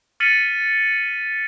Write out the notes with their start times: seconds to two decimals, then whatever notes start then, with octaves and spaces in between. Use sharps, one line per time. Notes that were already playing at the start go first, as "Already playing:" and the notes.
0.20 F6 A6 B6 C#7 D#7 F#7